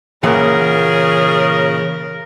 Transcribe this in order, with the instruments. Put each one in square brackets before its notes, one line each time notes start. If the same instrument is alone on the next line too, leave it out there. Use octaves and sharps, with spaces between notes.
[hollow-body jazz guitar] A#2 E3 F#5 [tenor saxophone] C#3 [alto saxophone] G#4 [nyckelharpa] A#4